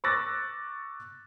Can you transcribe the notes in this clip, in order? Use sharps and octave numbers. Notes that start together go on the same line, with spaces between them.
C#6 D6 E6 F#6 A6 A#6